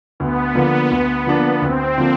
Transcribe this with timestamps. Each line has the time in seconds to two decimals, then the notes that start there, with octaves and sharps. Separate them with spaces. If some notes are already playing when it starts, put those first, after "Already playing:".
0.20 D2 B3
0.55 D3 F3 A#3 D4
0.91 D2
1.26 D3 F3 A#3 D4
1.62 D2 C4
1.98 D3 F3 A#3 D4